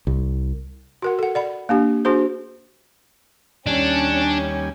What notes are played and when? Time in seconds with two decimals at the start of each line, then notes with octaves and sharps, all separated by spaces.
0.07 C2
1.02 F#4 A#4 F#5
1.19 A4 F#5
1.35 D5 F#5 B5
1.69 A#3 D4 G4
2.05 D4 F#4 G#4 C5
3.67 D#2 G3 C#4 D4 G#5